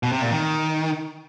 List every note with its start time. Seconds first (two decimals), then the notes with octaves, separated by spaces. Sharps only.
0.03 B2
0.13 C3
0.22 A#2
0.32 D#3